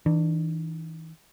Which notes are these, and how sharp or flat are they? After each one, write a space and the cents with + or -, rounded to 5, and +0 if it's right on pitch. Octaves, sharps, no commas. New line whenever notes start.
E3 -30 D4 +25